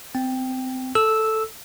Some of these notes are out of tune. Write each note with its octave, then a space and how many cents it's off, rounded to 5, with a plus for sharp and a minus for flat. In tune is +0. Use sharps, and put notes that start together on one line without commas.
C4 -25 G5 +0
A4 +0 E6 -5